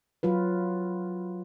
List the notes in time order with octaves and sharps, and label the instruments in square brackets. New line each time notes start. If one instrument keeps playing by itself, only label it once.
[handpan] F#3 F4 B4